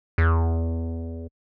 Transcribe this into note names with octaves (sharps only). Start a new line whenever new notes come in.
E2